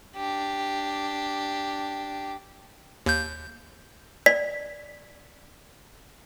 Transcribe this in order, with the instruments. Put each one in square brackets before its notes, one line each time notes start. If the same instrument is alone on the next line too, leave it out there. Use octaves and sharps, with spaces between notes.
[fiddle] D4 G4
[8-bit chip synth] D#2 G6
[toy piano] D5 [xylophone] B6